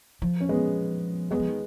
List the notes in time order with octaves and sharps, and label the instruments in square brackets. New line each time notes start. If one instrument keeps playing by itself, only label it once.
[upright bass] F3
[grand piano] C#4
G#3 B3
[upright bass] F#3 [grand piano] G#3 B3
[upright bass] F3
D#3